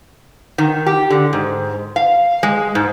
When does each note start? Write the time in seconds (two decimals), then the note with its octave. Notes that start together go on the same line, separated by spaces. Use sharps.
0.58 D#3
0.87 G4
1.10 D3
1.33 G#2
1.96 F5
2.43 G#3
2.75 G#2